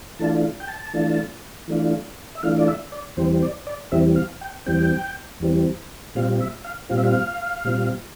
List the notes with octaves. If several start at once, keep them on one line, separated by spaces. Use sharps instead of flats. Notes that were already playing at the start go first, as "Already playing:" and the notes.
E3 A3 D4 F4 A5
G5
A5
E3 A3 D4 F4
E3 A3 D4 F4
E5
E3 A3 D4 F4 F5
D5
E5
D5
E2 E3 G3 C4 C5
C5
D5
D5
E2 E3 G3 C4 E5
F5
G5
E2 E3 G3 C4 G5
E2 E3 G3 C4
A#2 G3 C4 F4 F5
E5
F5
A#2 G3 C4 F4 F5
E5
F5
A#2 G3 C4 F4